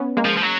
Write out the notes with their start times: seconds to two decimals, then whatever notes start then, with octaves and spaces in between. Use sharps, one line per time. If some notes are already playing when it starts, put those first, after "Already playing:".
Already playing: B3 C#4
0.17 G#3 A#3
0.25 F3
0.37 F3
0.42 F#3